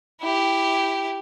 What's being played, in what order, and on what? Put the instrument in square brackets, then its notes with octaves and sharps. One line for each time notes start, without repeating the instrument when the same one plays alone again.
[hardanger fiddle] E4 G4